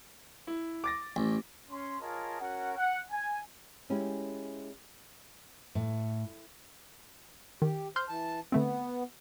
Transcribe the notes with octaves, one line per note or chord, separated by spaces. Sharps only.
E4
D6 A6 A#6
A1
C#4 C6
F4 G#4 A#4 C#5 D#5 A5
C#4 F#4 A#4 F#5
F#5
G#5
G#3 C#4 E4 G4
A2
D#3 G4
C5 C6 F6 G6
E3 A5
D3 A3 B3 C4